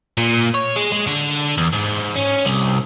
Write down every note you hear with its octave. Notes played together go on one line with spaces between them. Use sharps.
A#2
C#5
G#3
G#3
D3
E2
G#2
C#4
C2